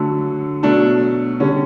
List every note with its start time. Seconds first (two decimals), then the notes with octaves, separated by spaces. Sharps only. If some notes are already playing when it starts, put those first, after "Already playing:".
Already playing: D3 F#3 A3
0.63 B2 F#3 A3 D4
1.40 D3 G3 C#4